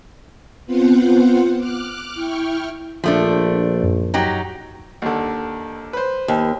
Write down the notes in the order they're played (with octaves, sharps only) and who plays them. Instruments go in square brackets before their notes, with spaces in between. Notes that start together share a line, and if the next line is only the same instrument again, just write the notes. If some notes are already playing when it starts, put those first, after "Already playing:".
[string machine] B3 C4 F4 C5 F#5
D6 F6 F#6
E4 G5 C#6 F6
[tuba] A#1 [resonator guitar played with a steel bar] F3 A3 D4
[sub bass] F#2
[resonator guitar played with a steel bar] F#3 D#4 G4
[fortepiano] D#2 D3
B4 C5
[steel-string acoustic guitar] D#2